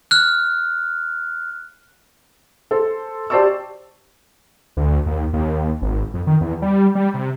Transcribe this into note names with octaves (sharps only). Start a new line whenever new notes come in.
F6 F#6
A4 C5
G4 C5 D5 A5 C#6 E6
D2
D#2
D#2
G#1
F2
D#3
E2
G3
G3
C3